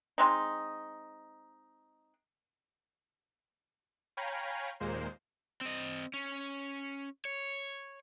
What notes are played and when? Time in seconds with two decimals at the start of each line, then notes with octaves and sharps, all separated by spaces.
0.18 G#3 C4 D#4
4.17 C#5 F5 G5 G#5 A#5 B5
4.80 D#2 A#2 G#3 A#3 C5
5.61 C4 D#5
6.14 C#4
7.25 C#5